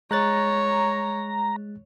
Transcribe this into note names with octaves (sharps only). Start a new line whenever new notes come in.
G#3 C#5 A#5 F#6 A6